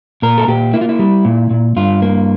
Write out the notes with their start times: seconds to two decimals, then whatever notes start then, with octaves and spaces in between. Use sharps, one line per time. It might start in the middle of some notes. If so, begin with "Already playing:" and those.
0.22 A#2 A#4
0.38 A4
0.48 A#2 G4
0.73 A#3 E4
0.81 F4
0.89 E4
0.99 G3
1.25 A#2
1.51 A#2
1.76 G2 F4
2.02 A#3